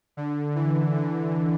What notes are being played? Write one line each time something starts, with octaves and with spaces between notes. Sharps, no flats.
D3
E3
D3